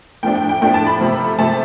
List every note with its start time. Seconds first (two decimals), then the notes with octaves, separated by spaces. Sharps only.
0.23 A2 F3 A3 D4 G5
0.35 G5
0.49 G5
0.62 A2 F3 A3 D4 G5
0.74 A5
0.87 B5
1.00 C3 F3 A3 C4
1.38 C3 F3 A3 C4 A5